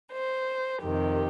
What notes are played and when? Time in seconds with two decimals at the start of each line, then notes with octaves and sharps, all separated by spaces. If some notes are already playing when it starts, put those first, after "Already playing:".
0.12 C5
0.81 F2 C3 D#3 G4